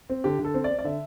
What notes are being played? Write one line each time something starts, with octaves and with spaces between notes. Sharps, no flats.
C4
D3 G4
D3
A4
C4
D5
C4
D5
D3 E5